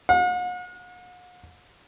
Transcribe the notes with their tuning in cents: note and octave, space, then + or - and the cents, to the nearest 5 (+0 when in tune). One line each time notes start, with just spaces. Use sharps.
F#5 -45